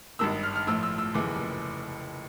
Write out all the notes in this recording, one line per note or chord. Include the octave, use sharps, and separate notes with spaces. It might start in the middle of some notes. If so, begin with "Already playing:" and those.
G#1 G2 D#3 E6
F6
F6
A#1 A2 F3 E6
E6
E6
F1 D#2 C#3 E3 D6